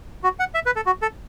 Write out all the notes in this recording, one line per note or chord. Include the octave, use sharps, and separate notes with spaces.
F#4
F#5
E5
B4
A4
F#4
A4